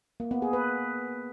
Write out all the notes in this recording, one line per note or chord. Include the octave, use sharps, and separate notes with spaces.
A#3
B3
G#4
B4